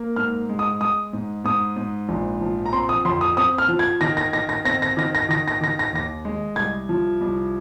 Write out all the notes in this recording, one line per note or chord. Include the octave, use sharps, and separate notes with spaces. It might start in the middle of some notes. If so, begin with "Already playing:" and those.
Already playing: A#3
G#2 F6
G#3
D#6
G#3 D#6
G#2
G#2 D#6
G#2
A#1
F3
A#5
C4 C6
D#6
F2 C6
D#6
C4 D#6
F6
F3
G#6
D#3 A#6
A#6
D#3 A#6
A#6
C4 A#6
A#6
D#3 A#6
A#6
D#3 A#6
A#6
D#3 A#6
A#6
D#2 A#6
G#3
C2 G#6
F3
C2